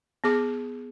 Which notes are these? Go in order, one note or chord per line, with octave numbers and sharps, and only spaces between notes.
B3 G#4 D6